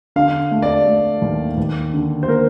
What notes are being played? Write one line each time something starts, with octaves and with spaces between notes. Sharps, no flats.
D3 F5
A3
D5
A3
D#2
D#2
D3
C5
A#3 A#4